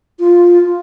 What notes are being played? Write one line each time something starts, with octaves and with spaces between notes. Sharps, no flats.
F4